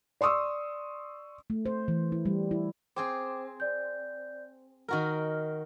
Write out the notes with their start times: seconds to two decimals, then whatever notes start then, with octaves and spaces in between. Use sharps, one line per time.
0.21 D5 C6 C#6 D#6 E6
1.50 A3
1.66 C5
1.88 E3
2.12 E4
2.25 G3
2.51 E4
2.96 C4 G#4 C5 G5 D6
3.60 D5 G6
4.89 D#3 F#4 A#4 F6